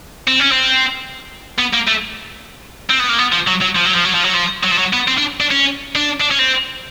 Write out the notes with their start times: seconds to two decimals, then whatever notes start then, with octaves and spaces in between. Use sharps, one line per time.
0.27 C4
0.39 C#4
0.51 C4
1.58 B3
1.73 A#3
1.87 A3
2.90 C4
2.99 B3
3.09 A#3
3.19 B3
3.33 F3
3.48 F#3
3.62 F#3
3.76 F3
3.86 F#3
3.96 F3
4.05 F#3
4.15 F3
4.24 F#3
4.34 F3
4.64 F#3
4.72 F3
4.79 F#3
4.93 B3
5.08 C4
5.18 D4
5.41 D4
5.51 C#4
5.95 D4
6.20 D4
6.31 C#4
6.39 C4